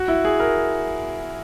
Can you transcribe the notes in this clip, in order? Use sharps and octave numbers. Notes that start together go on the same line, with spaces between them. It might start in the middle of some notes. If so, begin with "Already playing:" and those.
Already playing: F#4
E4
G#4
A#4